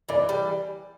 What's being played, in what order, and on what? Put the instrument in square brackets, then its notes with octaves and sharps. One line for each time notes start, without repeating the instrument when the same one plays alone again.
[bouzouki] E3 [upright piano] D5
[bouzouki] G3